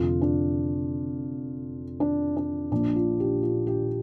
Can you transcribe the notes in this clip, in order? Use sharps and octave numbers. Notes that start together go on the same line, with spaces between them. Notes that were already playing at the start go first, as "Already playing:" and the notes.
Already playing: F1 F2 D3 F4
D4
D4
D4
A#1 A#2 F3 D4
F4
G4
F4
G4